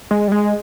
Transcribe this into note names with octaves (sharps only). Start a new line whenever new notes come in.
G#3
G3
G#3